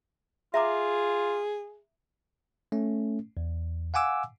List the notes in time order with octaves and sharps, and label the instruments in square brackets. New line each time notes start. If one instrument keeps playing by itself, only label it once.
[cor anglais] F4 [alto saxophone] G#4 [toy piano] E5 A#5 D6
[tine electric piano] A3 C#4
E2
F5 F#5 G#5 D6 E6